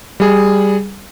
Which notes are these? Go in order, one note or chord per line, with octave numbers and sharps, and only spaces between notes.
G3 G#4